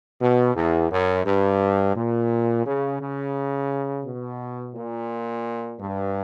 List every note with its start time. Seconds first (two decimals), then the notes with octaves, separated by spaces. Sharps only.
0.20 B2
0.55 E2
0.90 F#2
1.25 G2
1.96 A#2
2.65 C#3
3.00 C#3
4.05 B2
4.75 A#2
5.80 G2